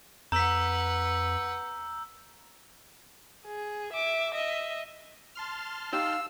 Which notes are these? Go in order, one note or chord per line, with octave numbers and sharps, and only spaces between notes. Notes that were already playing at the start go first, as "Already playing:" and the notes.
F2 B4 F#5 A#5 E6 G6 B6
G#4
E5 D6
D#5 E5
A5 C6 F6
D#4 G4 F5 E6